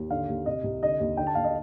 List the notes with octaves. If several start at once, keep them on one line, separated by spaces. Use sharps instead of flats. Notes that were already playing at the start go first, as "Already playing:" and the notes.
Already playing: D#2
D3 F5
D#2
C3 D#5
C2
D3 D#5
D#2
D3 G5
A5
D#2 F5
D#5